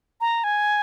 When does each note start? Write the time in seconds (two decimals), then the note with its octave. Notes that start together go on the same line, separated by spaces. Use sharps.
0.21 A#5
0.44 G#5